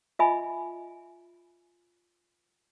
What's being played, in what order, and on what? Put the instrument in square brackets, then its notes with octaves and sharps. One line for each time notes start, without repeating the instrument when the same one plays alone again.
[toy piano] F4 D#5 E5 G#5 B5